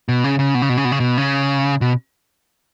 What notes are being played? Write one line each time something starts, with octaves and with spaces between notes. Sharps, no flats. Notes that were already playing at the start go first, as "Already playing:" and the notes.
B2
C#3
C#3
B2
C#3
B2
C#3
B2
C#3
B2
C#3
B2